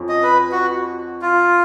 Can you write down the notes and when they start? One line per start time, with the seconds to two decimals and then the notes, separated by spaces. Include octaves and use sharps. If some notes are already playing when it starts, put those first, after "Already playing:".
Already playing: F2 F3 C#4
0.09 D#5
0.23 B4
0.52 F#4
1.22 F4